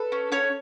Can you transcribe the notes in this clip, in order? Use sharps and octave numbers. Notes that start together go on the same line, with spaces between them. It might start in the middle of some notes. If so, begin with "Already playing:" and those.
Already playing: A4 B4
C#4
C#4 C#5